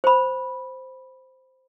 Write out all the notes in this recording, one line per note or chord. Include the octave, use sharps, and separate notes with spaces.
C5 B5